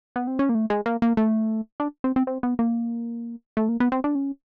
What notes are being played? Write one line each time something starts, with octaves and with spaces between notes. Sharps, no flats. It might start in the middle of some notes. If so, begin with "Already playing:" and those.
B3
C4
C#4
A#3
A3
G#3
A#3
A#3
A3
D4
C4
C4
C4
B3
A#3
A3
A#3
B3
C4
D4
C#4